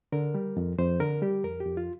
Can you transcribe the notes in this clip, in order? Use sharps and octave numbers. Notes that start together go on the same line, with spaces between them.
D3 A#4
G3
F2
F2 C5
D3 A#4
G3 G4
F2 A#4
G4
F2
F4